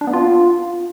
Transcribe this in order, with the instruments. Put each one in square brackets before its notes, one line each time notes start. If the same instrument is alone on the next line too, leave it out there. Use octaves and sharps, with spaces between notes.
[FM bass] D4
B3
F4